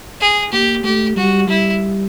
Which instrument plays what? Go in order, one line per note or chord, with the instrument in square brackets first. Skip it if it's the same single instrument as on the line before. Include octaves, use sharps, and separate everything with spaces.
[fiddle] G#4
[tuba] A#3 [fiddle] G4
[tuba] A3 [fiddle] G4
[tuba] G3 [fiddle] F#4
[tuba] G3 [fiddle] E4